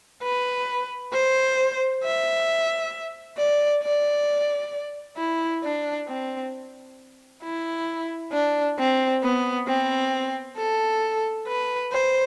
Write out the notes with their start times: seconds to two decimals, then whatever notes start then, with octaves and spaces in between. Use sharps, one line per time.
0.23 B4
1.13 C5
2.03 E5
3.38 D5
3.82 D5
5.17 E4
5.63 D4
6.08 C4
7.43 E4
8.32 D4
8.78 C4
9.23 B3
9.67 C4
10.57 A4
11.48 B4
11.92 C5